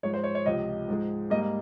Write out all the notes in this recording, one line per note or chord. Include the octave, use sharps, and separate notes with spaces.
G#2 F3 G#3 C#5
C5
C#5
C#5
C#2 C3 F3 D#5
G#2 F3 G#3
G#2 G3 A#3 D#5